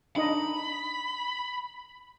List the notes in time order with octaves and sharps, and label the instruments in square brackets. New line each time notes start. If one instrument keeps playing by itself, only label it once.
[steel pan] D4 D#4 D#5 [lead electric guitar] B5